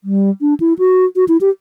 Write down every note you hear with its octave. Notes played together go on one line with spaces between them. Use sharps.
G3
D4
E4
F#4
F#4
E4
G4